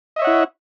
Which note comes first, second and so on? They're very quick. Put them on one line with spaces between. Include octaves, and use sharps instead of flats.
D#5 E5 C#5 F#5 E4